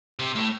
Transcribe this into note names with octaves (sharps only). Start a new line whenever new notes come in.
C3
A2